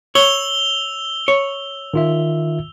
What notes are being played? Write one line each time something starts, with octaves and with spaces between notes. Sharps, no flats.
C#5 E6 F7 G7
C#5
D#3 F4 E5